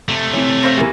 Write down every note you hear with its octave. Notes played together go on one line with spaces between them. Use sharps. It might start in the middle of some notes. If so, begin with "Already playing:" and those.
C3 A3
E3 C4 C#5
C4 C5 F5 C#6 A#6
E2 E3 A#3 G4 A#4